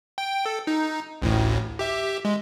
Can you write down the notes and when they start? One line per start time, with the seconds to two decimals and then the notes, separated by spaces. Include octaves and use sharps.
0.18 G5
0.46 A4
0.67 D#4
1.22 A1 D2 A2
1.79 G4 E5
2.25 G#3